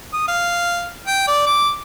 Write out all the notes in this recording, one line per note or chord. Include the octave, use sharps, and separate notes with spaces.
D#6
F5
G5
D5
D6